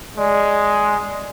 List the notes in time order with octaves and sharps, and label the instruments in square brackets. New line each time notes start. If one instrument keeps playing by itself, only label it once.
[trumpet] G#3 [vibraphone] D5